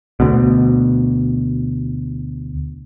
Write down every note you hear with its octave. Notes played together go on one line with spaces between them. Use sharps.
D2 B2